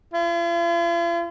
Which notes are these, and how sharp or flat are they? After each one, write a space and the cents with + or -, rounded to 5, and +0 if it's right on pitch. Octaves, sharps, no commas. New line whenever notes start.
F4 -45